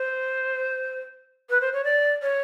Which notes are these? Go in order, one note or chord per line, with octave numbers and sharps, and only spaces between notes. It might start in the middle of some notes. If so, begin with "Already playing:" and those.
Already playing: C5
B4
C5
C#5
D5
C#5